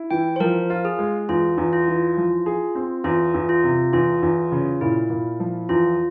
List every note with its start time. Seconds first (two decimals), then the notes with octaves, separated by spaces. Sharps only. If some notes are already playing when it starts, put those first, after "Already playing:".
Already playing: E4
0.11 E3 G5
0.36 C5
0.40 F3 A#4
0.70 F4
0.85 G#4
0.99 G#3
1.29 E2 F4
1.58 E2
1.73 F4
1.88 E3
2.17 F3
2.46 G#4
2.75 C4
3.04 E2 F4
3.34 E2
3.49 F4
3.64 C3
3.93 E2 F4
4.23 E2
4.52 C#3
4.81 A#2 E4
5.10 A#2
5.40 F3
5.69 E2 F4